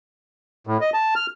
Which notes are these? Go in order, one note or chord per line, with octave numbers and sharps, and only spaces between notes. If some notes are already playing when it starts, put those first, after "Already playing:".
A2
D#5
A5
F6